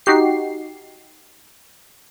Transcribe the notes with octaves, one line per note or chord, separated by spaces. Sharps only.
D#4 F#4 G4 C7